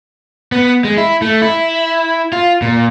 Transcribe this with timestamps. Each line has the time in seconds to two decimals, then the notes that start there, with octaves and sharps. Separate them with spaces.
0.52 B3
0.84 G#3
0.97 E4
1.22 A3
1.42 E4
2.33 F4
2.62 A#2